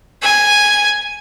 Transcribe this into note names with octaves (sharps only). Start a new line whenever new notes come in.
G#5